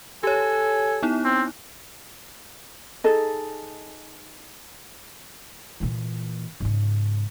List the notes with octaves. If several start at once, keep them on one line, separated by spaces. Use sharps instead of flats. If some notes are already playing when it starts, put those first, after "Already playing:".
G4 A4 C#5 G#5
B3 D#4 E4
C4
D#4 G#4 A4 D#5
A#2 E3
G#2 C#3